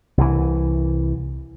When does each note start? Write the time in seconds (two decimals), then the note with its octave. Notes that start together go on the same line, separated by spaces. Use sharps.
0.18 C2 E3